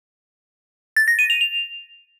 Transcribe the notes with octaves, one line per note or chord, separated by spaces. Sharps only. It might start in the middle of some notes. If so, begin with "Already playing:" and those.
A6
A#6
D#7
F7
F7